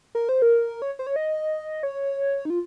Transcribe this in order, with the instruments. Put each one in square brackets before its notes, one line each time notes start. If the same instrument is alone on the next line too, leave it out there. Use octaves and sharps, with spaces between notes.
[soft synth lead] A#4
C5
A#4
C#5
C5
C#5
D#5
C#5
D#4
F4